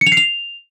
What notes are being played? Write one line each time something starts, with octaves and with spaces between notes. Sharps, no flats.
C#7
F7
C7
F7